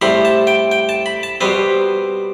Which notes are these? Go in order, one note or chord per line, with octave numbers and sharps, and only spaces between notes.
A2 G3 C4 B5
A5
G5
G5
A5
B5
A5
B2 G3 C4 B4